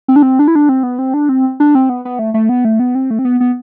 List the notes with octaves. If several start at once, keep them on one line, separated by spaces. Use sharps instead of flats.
C4
D4
C4
D4
E4
D4
C4
B3
C4
D4
C4
D4
C4
B3
B3
A3
A3
B3
A3
B3
C4
A3
C4
B3
B3